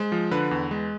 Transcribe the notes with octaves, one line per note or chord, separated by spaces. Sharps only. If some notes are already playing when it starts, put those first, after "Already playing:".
Already playing: G#3 C5
F3
D3 B4
E2
G#3